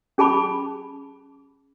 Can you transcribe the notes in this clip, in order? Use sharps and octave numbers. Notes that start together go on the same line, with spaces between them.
C#4 G#4 A5 B5 D6